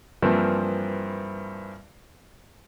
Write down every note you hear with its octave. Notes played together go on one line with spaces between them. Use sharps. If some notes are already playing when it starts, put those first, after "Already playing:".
G2 E3 F3 A#3 C4 E4